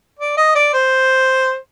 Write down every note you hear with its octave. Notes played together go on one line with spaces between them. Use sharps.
D5
D#5
D5
C5